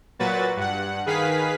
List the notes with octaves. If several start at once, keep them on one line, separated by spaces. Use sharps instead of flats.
A#2 F#3 F#4 B4 A6
G2 F#5
D#3 G#4 B4 F5 B6